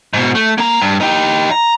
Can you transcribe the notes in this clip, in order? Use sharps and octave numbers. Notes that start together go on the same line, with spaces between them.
G#2 B2
A3
A#3 A#5
G2
D#4 G4
A#5